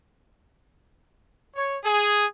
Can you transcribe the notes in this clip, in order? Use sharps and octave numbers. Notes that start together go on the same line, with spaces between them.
C#5
G#4